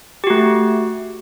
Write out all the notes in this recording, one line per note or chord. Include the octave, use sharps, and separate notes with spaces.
A3 F#4 G4